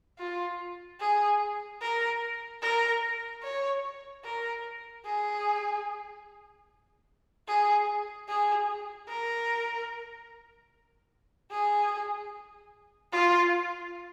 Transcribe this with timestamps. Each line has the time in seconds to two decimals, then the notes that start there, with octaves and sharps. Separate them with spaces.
0.19 F4
1.01 G#4
1.81 A#4
2.62 A#4
3.43 C#5
4.24 A#4
5.05 G#4
7.47 G#4
8.28 G#4
9.08 A#4
11.51 G#4
13.12 F4